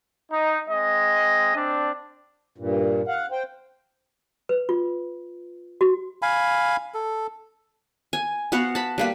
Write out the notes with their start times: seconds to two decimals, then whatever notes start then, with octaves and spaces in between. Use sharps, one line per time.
0.31 D#4
0.70 G#3 C4 D#5
1.54 C4 D4
2.58 G2 A#2
3.08 F5 F#5
3.32 C5 G5
4.49 B4
4.69 F4
5.81 F#4
6.22 F5 G#5 B5
6.94 A4
8.13 G#5
8.52 B3 F#4 F5 F#5
8.75 A5 B5
8.98 G3 A#3 B4